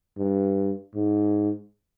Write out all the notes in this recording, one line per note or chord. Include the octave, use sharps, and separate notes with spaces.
G2
G#2